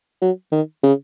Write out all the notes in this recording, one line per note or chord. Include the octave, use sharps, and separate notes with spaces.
F#3
D#3
C#3